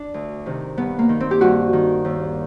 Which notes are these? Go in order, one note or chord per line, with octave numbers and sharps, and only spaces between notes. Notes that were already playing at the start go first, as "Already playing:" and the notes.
Already playing: D4
D2
C3 D#3
G2 B3
A#3
D#3
C4
G4
G2 F#4
D#3
D#2